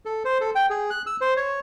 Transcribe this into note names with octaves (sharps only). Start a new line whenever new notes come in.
A4
C5
A4
G5
G#4
F#6
E6
C5
C#5